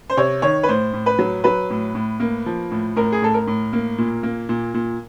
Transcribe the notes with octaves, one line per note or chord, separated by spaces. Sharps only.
C5
C3 C#5
D#3 C#5
B4
A2 C5
A2
B4
F#3
F#3 B4
A2
A2
A#3
F3
A2
A2 A#4
G#4
A2 A4
A#4
A2
A#3
A#2
A#3
A#2
A#2